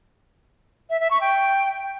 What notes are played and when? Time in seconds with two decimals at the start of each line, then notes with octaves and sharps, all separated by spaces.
0.90 E5
1.00 E5
1.11 C#6
1.21 G5